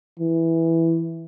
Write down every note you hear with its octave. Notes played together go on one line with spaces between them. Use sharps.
E3